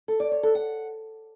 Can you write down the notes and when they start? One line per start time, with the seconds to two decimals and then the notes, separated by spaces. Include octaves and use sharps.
0.08 A4
0.20 D5
0.32 C#5
0.43 A4
0.55 F#5